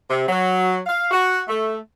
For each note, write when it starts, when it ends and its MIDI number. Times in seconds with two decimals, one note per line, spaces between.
0.10 0.27 48
0.29 0.78 54
0.87 1.08 77
1.11 1.40 66
1.48 1.76 57